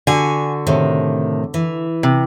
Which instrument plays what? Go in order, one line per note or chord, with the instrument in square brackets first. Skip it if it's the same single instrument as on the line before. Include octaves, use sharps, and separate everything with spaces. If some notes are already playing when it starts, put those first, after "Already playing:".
[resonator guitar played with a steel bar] D3 F#4 [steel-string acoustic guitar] G#5
[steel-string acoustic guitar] A2 C3 D#3
E3
[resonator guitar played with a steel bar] C3